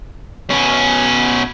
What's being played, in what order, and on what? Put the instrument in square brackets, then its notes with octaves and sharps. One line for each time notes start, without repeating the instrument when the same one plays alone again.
[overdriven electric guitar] B2 C#4